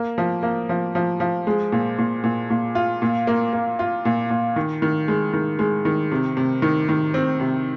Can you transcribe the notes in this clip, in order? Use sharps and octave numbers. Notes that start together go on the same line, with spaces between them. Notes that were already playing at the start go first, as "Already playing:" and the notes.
Already playing: A#3
F3
A#3
F3
F3
F3
G#3
A#2
A#2
A#2
A#2
F4
A#2
A#3
A#3
F4
A#2
A#2
D#3
D#3
G#3
D#3
G#3
D#3
C3
C3
D#3
D#3
C4
C3